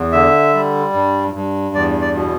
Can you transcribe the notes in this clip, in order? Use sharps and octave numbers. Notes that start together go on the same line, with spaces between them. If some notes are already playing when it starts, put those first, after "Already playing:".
Already playing: E2
D3 E5
G3
G2
G2
E2 D5
D5
B2